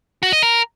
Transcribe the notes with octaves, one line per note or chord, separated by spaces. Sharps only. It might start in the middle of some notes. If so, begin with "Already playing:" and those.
F#4
D#5
A#4